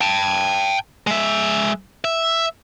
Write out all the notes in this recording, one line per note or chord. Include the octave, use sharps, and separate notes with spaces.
G5 A5
G#3 E5
E5